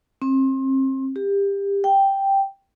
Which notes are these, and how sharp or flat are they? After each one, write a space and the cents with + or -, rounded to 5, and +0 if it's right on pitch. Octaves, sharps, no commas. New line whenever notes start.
C4 +35
G4 +25
G5 +0